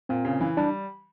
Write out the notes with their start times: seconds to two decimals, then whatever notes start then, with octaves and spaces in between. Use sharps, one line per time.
0.09 A#2 C4
0.25 C#3
0.41 E3
0.57 G3 D4